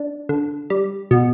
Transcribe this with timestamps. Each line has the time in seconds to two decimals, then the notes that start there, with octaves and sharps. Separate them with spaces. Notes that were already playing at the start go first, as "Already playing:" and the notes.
Already playing: D4
0.29 D3
0.70 G3
1.11 B2